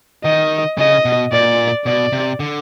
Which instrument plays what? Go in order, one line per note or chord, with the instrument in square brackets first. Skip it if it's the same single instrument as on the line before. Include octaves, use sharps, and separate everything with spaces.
[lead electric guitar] D#3 [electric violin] D#5
[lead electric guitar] C#3 [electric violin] D#5
[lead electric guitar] B2
[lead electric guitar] A#2 [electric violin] D5
[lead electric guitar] B2 [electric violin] D5
[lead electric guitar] C3
D3